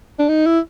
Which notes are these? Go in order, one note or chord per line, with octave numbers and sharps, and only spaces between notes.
D4
D#4
E4